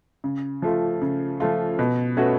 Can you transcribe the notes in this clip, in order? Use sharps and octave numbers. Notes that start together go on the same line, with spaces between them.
C#3
F3 A3 F4
C#3
F3 A3 F4
B2
A3 C#4 F#4 B4